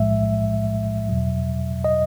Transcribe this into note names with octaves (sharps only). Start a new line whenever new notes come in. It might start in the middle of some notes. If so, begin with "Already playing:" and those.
Already playing: B1 A2 F3 G#3 E5
E2 B2 F#3
D#5